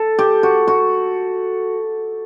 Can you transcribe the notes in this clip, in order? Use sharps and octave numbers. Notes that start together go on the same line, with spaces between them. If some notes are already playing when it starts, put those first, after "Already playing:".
Already playing: A4
G4
F#4
F#4